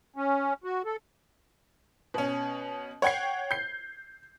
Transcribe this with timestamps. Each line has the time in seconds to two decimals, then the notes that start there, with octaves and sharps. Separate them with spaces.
0.16 C#4
0.64 F#4
0.85 A4
2.14 B2 C#4
3.02 C#5 F#5 G5 G#6 C7
3.51 G6 C7